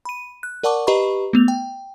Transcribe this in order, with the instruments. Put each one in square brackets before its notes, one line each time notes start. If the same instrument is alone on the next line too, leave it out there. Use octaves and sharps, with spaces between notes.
[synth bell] B5 D#7
F#6
A#4 D5 F#5 A5 C#6 D6
G4 B4 D#5 A#5 B5 C#6
A3 B3 F7
G5